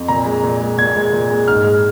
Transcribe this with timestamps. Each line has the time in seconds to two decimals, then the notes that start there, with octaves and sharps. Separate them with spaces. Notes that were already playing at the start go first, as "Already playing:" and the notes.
Already playing: F2
0.08 A#2 A#5
0.26 G#3
0.43 A#2
0.61 G#3
0.78 A#2 G#6
0.96 G#3
1.13 A#2
1.30 G#3
1.48 G#2 F6
1.64 G#3